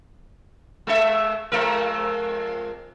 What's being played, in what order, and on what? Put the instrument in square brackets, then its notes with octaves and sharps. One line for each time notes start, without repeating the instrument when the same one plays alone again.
[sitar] G#3 A4 E5
F2 G#3 A#4